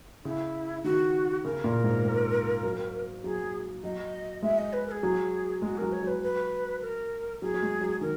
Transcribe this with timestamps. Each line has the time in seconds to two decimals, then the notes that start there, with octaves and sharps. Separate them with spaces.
0.24 C#3 E4
0.84 D#3 F#4
1.44 C#3 A#4
1.64 A#2
1.84 G#2
2.05 G#2
2.63 F#3
3.24 F#3 G#4
3.84 F#3 D#5
4.42 G#3 E5
4.58 D#5
4.73 B4
4.87 A#4
4.91 G#4
5.03 F#3
5.62 G#3 F#4
5.77 F#3 A#4
5.92 C#5
6.02 F#3 B4
6.22 B4
6.81 A#4
7.42 F#3 G#4
7.54 F#3
7.62 G#3
7.81 F#3
8.01 D#3 A#4